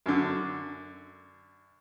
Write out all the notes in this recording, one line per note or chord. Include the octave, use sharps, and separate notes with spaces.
F#2 D3